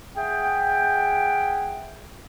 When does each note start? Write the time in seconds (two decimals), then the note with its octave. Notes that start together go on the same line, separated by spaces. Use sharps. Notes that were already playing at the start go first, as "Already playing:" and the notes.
0.17 G#4 E5 F#5 G5